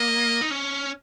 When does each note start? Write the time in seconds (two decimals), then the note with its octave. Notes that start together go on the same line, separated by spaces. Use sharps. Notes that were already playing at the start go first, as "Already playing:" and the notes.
Already playing: A#3 D#5
0.41 D#4
0.51 C#4